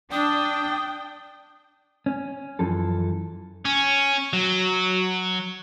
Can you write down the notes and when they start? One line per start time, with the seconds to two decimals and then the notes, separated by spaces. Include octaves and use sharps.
0.12 D4 G5 D#6
2.06 C#4
2.59 F#2 E3 F3 A4
3.65 C#4
4.33 F#3